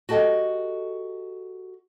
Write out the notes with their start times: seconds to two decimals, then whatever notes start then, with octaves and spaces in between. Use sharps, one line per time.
0.09 F#4 G4 A4 D#5 G5